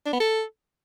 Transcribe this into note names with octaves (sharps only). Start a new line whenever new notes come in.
D4
B3
A4